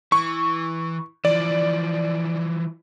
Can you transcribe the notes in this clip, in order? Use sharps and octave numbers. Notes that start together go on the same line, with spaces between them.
E3 C#6
E3 F3 D5